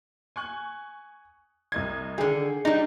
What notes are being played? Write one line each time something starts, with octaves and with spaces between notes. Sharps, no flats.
G#5 C#6 F#6
C2 D#5 G#6
D3 D#3 G#4
G3 D4 D#4